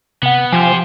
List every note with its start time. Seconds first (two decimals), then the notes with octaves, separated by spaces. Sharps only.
0.23 C3 B3 F#5
0.53 F3 G4 C5 G#5